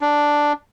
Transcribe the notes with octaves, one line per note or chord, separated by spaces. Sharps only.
D4